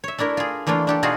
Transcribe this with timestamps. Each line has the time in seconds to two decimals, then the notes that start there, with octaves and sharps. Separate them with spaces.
0.04 C#5 E5
0.18 A3 D4 E4 A#4
0.37 F4 G#4
0.67 E3 A3 A#3 D4 F4
0.87 D4 G4 A4
1.03 B2 D#4 F4 F#4 G#4 A4